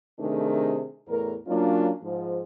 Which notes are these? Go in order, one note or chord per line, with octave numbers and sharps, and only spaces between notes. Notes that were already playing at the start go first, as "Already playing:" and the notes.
C3 D#3 A3 D4 G#4
E2 A2 A#4
F#3 A#3 C#4 D4 F4
G#2 F3